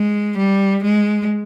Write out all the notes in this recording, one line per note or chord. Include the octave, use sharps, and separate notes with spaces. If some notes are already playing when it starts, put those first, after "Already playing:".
Already playing: G#3
G3
G#3